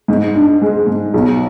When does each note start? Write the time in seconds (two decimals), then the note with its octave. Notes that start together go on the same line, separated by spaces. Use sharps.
0.08 G#2
0.35 D4
0.62 G#3
0.87 G#2
1.14 B1